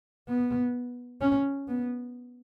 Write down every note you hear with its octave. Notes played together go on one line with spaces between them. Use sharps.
B3
C#4
B3